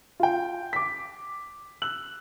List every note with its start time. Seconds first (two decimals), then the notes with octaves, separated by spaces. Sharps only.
0.20 F4 G5
0.73 D6 B6
1.82 E6 F#6 F#7